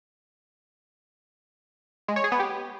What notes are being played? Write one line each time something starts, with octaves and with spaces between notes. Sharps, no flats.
G#3
C#5
G#4
B3
G4